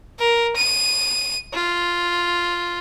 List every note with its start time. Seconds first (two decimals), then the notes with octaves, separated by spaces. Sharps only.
0.19 A#4
0.56 D#7
1.54 F4